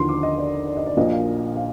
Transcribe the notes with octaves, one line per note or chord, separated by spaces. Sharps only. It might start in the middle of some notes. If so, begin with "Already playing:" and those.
Already playing: D#2 D3 F3 C6
D6
D#5
D5
D5
D#5
D5
A#1 A#2 F3 D#5
F5
F5